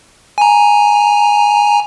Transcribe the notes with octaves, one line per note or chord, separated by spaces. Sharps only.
G#5 A#5